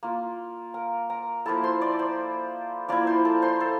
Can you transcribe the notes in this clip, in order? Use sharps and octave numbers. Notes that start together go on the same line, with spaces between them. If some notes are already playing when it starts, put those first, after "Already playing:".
A#3 F4
A#4 A#5
A#4 A#5
F3 A#3 E4 A4 A5
C5 C6
D5 D6
C5 C6
F3 A#3 E4 D5 D6
C5 C6
A4 A5
C5 C6
A4 A5